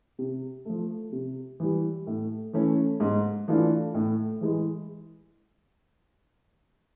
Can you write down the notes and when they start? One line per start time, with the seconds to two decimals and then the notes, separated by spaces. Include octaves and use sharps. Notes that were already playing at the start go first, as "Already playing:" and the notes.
0.19 C3
0.65 F3 A3
1.12 C3
1.60 E3 G3
2.07 A2
2.53 E3 A3 C#4
3.00 G#2
3.48 E3 A3 D4 F4
3.94 A2
4.41 E3 G#3